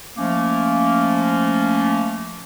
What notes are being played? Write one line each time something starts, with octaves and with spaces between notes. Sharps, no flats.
F3 A3 A#3 C#4